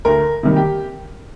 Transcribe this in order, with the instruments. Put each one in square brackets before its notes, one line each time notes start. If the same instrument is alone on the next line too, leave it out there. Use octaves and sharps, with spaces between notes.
[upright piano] D2 A#4
C3 D#3 G3 A#3
G4